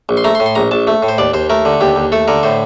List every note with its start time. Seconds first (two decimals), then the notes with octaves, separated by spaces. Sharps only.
0.09 A#1
0.17 C6
0.24 A3 A#5
0.35 C6
0.40 A2
0.46 C6
0.55 A#1 A#5
0.71 A#1 A5
0.87 A3
1.03 A2
1.08 C5
1.18 D#2 D5
1.34 D#2 C5
1.50 A3 A#4
1.65 D3
1.81 D#2 G4
1.96 D#2
2.12 A3 A4
2.28 D3 A#4
2.43 A2 C5